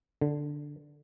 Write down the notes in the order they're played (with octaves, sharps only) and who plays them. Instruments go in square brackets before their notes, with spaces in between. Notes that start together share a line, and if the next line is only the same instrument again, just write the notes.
[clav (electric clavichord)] D3